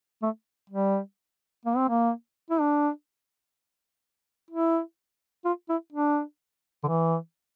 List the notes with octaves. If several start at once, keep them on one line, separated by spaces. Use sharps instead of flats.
A3
G3
A#3
C4
A#3
E4
D4
E4
F4
E4
D4
D3
E3